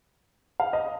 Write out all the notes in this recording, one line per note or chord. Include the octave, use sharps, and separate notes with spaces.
F5
D#5